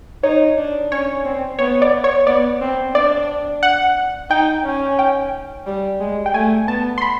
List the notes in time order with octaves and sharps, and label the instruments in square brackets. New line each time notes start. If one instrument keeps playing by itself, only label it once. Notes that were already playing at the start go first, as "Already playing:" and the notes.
[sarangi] D#4 [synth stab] C#5
[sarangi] D4
[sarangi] C#4 [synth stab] C#5
[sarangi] C4
[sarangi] B3 [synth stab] C#5
[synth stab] D5
C#5
[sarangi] B3 [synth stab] D5
[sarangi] C4
[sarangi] D4 [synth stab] D5
[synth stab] F#5
[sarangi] D#4 [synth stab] G5
[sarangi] C#4
[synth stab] G5
[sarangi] G3
G#3
[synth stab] G5
[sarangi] A3 [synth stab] G#5
[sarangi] B3 [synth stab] A5
[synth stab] C6
B5